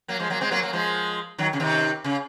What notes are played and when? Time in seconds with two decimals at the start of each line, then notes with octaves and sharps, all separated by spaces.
0.08 F#3 A#3
0.20 F3 G#3
0.30 F#3 A#3
0.41 G#3 C4
0.51 F#3 A#3
0.62 F#3 A#3
0.73 F3 G#3
1.38 D#3 F#3
1.53 C#3
1.60 C3 D#3
2.04 C#3